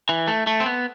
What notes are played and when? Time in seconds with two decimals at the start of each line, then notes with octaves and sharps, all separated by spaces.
0.09 E3
0.28 A3
0.47 A3
0.60 C4
0.66 B3